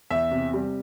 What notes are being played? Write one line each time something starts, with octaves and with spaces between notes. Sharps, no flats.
E2 E5
C3
G3